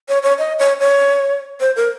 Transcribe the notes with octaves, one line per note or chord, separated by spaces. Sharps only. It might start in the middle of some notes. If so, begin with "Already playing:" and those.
C#5
C#5
D#5
C#5
C#5
C5
A#4